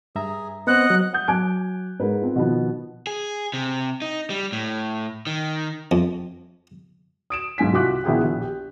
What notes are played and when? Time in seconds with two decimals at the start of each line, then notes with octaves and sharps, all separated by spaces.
0.15 G2 G#4 E5 A#5
0.67 B3 C4 C5 D#5 F#5 F#6
0.90 F#3
1.13 F#5 D#6 G6
1.28 F#3 G#5 D6 F#6 G#6 D7
2.00 G#2 A#4 B4
2.21 C4 F4
2.36 B2 D#3 F3 B3
3.07 G#4
3.54 C3
4.02 D#4
4.30 G3
4.52 A2
5.27 D#3
5.91 F2
7.30 D#6 D7 E7
7.58 B1 G#2 G#5 B6
7.73 C2 F4 F#4 D6 F#6
8.04 A#1 B3 E4 G#4 G5
8.24 A#1
8.41 G4